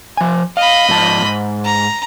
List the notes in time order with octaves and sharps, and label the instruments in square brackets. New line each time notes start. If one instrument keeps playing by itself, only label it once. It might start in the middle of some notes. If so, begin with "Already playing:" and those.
[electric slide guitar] F3 G#5
[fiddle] D#5 B5 [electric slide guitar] F5
[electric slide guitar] G#2 F3 A5
G#2
[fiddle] A#5